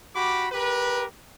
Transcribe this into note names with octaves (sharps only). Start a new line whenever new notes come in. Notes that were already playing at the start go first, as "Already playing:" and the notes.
F#4 G4 B5 D6
G4 A#4 B4